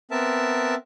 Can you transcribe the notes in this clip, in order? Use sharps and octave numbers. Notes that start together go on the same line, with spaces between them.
B3 C4 A#4 E5 A5